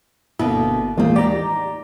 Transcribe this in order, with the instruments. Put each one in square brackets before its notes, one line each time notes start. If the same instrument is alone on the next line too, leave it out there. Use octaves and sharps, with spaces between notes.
[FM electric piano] G1 [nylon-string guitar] B2 D3 A#3 [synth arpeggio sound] E4
[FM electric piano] D#2 A2 [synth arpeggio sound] E3 G#3 A#3 [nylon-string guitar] C4 F4
[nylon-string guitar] D#4 G4 [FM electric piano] D5 A#5